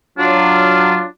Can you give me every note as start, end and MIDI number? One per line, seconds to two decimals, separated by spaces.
0.18 1.04 54
0.18 1.05 62
0.18 1.04 65